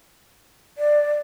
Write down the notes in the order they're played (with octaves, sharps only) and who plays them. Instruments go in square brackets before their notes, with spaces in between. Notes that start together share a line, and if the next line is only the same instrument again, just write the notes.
[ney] D5